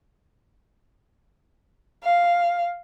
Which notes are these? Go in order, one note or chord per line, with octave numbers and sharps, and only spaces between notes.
F5